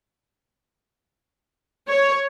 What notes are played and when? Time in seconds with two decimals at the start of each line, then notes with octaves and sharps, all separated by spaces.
1.88 C#5